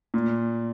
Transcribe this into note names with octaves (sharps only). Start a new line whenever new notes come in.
A#2